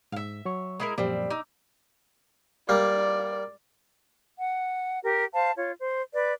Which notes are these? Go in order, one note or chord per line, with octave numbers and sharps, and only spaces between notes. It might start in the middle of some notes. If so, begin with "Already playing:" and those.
G#2 E5 F5
F#3 C#5 C#6
G#3 E4 A#4
F#2 A#2 F3 G3 C4
D#4 D6 E6
G3 A#3 D5
F#5
G4 A#4
C5 F5 A5
F4 C#5
C5
B4 D5